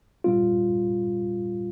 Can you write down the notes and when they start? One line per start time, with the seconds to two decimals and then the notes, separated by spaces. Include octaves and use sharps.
0.24 A#2 G3 C4 F4